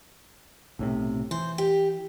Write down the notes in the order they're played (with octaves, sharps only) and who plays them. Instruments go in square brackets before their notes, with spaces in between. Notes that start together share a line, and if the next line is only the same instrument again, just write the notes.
[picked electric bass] B1 A2 C3
[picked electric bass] E3 [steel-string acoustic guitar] C5
[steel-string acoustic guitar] G4